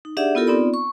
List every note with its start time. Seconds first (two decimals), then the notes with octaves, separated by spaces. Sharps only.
0.05 D#4
0.17 D4 G4 G#4 D5 E5 F#5
0.35 B3 E4 F4 G4 A4 A#4
0.47 B3 C4 D#4 F4 D5 B5
0.74 C#6